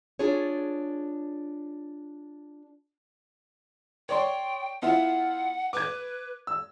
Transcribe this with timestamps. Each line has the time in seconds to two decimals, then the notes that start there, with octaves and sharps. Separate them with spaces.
0.19 D4 F4 G#4 C#5
4.09 C#5 D5 G5 C6
4.82 B3 E4 F4 F#5
5.73 B4 D6 G#6
6.47 E6